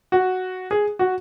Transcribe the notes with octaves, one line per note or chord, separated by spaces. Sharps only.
F#4
G#4
F#4